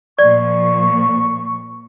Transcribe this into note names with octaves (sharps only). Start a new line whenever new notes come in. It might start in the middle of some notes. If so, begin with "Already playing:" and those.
A#2 F3 D5 C#6